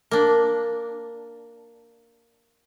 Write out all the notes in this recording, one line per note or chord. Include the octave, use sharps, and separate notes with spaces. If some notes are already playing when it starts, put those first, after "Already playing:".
A#3 D4